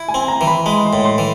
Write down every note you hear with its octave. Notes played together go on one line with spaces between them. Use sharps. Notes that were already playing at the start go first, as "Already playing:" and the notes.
Already playing: E4
G#5
C4
A#5
E3
B5
G#3 B5
C6
A2
C6
E3